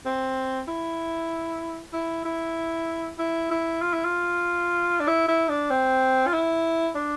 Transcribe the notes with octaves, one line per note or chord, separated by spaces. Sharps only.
C4
E4
E4
E4
E4
E4
F4
E4
F4
D4
E4
E4
D4
C4
F4
E4
D4